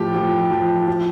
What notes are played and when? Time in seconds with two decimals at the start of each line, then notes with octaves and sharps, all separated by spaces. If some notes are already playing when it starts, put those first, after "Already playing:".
Already playing: A2 F3 G4
0.15 F3
0.51 F3
0.88 F3